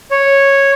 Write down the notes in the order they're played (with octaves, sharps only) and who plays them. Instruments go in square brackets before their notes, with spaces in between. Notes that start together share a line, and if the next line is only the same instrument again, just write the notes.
[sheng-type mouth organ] C#5